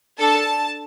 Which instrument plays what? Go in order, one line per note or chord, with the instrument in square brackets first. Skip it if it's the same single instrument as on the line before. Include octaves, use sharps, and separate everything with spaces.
[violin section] D4 A4 A5